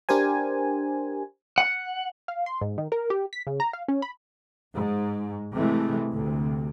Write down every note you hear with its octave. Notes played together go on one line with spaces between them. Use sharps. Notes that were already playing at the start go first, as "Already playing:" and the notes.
D4 G4 A#4 C5 G#5
F#5
F5
C6
G#2
D#3
A#4
G4
B6
C#3
A#5
F5
C#4
B5
G#2
C3 E3 G#3 A3
D2 C3